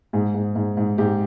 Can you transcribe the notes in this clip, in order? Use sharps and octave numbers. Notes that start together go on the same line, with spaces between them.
G#2 G#4
G#2
G#2
G#2
G#2 G4